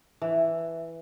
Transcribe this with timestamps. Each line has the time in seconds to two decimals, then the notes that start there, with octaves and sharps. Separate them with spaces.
0.22 E3